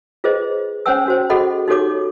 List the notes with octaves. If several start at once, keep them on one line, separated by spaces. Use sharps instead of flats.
F4 G#4 B4 C5 D#5
C#4 C5 C#5 F#5 G#5 E6
C#4 F#4 C5
F#4 G#4 A4 D#5 F#5 B5
D#4 F#4 G4 A4 C#5 D6